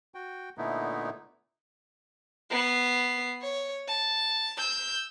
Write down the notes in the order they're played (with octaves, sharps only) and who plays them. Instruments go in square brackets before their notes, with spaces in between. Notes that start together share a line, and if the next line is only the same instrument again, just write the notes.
[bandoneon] F#4 G5
A#2 D3 A3 B3 D#4 E4
[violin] B3 C7
C#5
A5
E6 G6